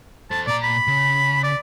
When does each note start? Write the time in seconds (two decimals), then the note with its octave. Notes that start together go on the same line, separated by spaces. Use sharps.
0.31 A4 C5 A5
0.47 A#2 D5 A#5
0.63 B5
0.87 C#3
1.44 D5